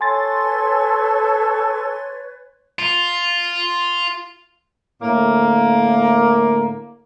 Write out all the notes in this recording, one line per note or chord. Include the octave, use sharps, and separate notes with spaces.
A4 B4 C#5 G#5 C6 A6
F4
A2 D3 A#3